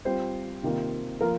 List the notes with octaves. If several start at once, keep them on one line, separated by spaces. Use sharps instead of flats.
G3 C4 F4 C5
C3 D#3 A#3 F4
F3 A#3 F4 A#4